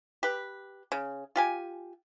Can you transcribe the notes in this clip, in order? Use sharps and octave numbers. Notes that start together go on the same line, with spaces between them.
G4 B4
C#3
F4 G4 G#5